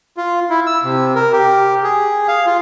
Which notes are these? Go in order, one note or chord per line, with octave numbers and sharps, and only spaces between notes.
F4
E4
E6
C3
A#4
G4
G#4
F5
F4